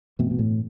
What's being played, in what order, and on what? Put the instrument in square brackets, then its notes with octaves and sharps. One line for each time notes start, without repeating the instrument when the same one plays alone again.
[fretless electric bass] G2 E3 A3 C4 [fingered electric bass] B2
[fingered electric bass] B2
A2